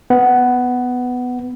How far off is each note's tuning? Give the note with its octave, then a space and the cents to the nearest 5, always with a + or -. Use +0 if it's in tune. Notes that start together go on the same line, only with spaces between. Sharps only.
B3 +10